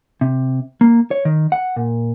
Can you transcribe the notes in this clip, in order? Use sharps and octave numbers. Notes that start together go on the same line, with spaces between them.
C3
A#3
C#5
D#3
F#5
A#2